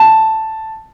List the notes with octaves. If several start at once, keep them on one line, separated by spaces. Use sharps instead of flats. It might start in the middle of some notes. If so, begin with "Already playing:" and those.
Already playing: A5